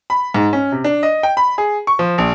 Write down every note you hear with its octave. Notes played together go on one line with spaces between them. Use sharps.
B5
G#2
C#4
C3
D4
D#5
G5
B5
G#4
C#6
F3
A#1